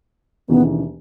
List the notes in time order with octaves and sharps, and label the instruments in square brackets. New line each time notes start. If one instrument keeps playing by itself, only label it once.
[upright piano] E1 D#2 C#3 E3 [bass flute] B3